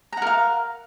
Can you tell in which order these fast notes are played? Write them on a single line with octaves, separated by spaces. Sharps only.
A#5 F#5 A#4 F5